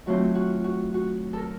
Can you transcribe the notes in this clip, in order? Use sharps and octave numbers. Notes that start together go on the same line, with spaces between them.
D#3 F#3 A3 C4 F4 F#4
F#4
F#4
F#4
A4 A#4